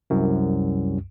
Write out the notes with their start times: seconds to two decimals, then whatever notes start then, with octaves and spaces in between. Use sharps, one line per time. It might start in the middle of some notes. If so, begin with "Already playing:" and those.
0.10 C2 F#2